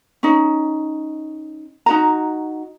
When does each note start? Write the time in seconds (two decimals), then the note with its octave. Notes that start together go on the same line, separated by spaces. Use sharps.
0.23 C#4 D#4
1.86 D#4 F#4 A#5